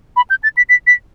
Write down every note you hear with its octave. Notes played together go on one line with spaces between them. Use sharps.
B5
G6
A6
B6
B6
B6